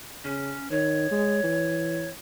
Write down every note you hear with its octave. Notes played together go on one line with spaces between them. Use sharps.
C#3 C#4
D#3 C#5
G#3
E3